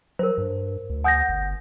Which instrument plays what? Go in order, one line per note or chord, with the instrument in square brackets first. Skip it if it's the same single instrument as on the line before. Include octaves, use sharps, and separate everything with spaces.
[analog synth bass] F#3 [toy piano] A#4 C5
[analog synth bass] G2
D2
[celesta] F#5 G6 A#6 [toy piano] G#5 D#6
[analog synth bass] G1